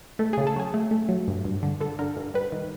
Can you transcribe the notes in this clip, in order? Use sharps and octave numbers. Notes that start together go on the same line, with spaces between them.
A3 A4
G#4
C#3
A4
F#3 G#4
A3
A3
F#3
G2
G2
D3
D3 A4
D3 A#4
G2
G3 B4
D#3